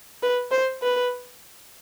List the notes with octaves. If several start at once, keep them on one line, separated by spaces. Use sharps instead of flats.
B4
C5
B4